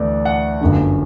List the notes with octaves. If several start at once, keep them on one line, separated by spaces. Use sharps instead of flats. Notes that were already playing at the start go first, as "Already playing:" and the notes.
Already playing: D2 E3 A3 D5
F#5
G1 F#2 D3